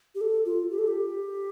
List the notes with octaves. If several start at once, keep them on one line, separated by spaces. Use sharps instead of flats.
G4
A4
F4
G4
A4
G4